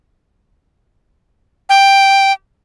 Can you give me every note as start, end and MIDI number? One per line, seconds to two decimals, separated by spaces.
1.69 2.32 79